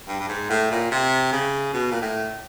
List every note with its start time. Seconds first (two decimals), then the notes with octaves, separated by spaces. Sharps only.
0.08 G2
0.20 G2
0.28 G#2
0.50 A2
0.71 A#2
0.91 C3
1.32 C#3
1.74 B2
1.91 A#2
2.01 A2